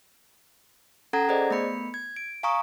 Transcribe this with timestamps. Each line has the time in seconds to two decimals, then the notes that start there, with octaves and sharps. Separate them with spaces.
1.13 C#4 A4 F#5 A#5 G#6 A#6
1.29 G#4 C5 D5 D#5
1.51 A3 B3 B5 C#7
1.94 G#6
2.16 D7
2.43 F5 G#5 A#5 C#6 D#6